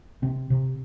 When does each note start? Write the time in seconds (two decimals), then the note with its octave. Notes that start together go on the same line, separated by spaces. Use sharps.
0.22 C3 C4
0.50 C3